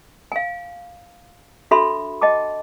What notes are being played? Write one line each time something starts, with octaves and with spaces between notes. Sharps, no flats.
F5 G#5
D4 F#4 A4 E5 B5 C6
D#5 G5 A5 D6